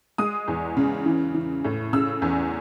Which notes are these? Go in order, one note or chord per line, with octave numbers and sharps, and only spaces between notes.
G#3 D#6
E2
C#3
E3
E3
A2
C#3 E6
E2